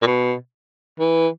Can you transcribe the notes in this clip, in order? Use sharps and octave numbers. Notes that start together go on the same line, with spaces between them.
A#2
B2
E3